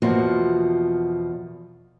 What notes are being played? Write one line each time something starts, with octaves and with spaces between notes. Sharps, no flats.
E2 B2 F3 A#3 F4 F#4